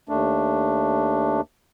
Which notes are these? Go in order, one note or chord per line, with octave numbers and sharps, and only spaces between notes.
D#2 A3 D4